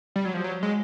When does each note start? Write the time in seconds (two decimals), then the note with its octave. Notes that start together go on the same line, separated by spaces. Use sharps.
0.16 G3
0.25 F#3
0.34 F3
0.44 F#3
0.63 G#3